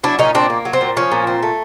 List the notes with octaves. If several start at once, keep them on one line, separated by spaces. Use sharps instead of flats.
F#3 D4 E4
A#2 C#4 D#4
A#2 C4 D4
A#3
F#3
C4
A#2
F3 C#4
A#2
C4
A3